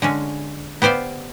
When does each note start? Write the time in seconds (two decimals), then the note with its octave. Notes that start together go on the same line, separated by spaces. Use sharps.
0.02 D3 G#3 C#4
0.82 B3 G4 C5 D5 F5